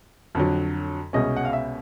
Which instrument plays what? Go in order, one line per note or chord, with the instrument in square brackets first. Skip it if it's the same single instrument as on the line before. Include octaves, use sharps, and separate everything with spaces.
[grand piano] F2 D3 F#3
C2 B2 G#3 C#4 D#5
F#5
F5
E5